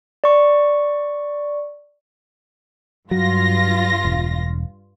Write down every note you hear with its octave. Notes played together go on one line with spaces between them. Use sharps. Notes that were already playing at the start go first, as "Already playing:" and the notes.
D5 C#6
G2 F#3 F4 A#6
E1